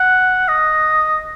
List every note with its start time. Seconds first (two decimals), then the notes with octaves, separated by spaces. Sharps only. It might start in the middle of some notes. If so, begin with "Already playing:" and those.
Already playing: F#5
0.48 D#5